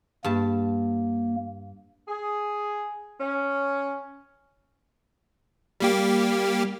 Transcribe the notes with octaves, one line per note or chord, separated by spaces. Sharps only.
G2 A#3 A5
G#4
C#4
G3 A#3 G4